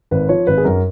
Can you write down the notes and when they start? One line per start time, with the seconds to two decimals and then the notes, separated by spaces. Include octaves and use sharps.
0.11 G#1 B4
0.29 F3 C#5
0.47 G#1 B4
0.58 G#4
0.65 F#2 A#4